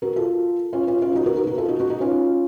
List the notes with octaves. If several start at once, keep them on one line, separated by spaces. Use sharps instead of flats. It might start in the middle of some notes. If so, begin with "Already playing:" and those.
F#4 A#4
F4 A4
C#4 F4
C#4 F4
C#4 F4
D#4 F#4
F#4 A#4
F#4 A#4
F#4 A#4
F4 A4
D#4 F#4
D#4 F#4
D#4 F#4
C#4 F4